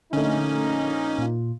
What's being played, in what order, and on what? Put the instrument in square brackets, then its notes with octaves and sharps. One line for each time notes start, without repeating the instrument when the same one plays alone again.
[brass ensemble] A#1 A#3 D#4 [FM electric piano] D3 A3 [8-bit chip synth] C#4
[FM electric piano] A#2 F4